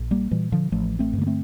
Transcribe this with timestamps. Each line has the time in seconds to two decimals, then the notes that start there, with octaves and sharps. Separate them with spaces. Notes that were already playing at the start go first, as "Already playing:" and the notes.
Already playing: A#1
0.11 G3 A#3
0.31 A#2 E3 G3
0.52 D3 F3
0.72 A1 F3 A3
0.99 A3 C4
1.13 G2
1.18 D3 A#3
1.27 A3 C4